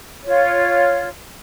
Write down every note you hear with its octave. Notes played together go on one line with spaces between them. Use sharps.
F4 C#5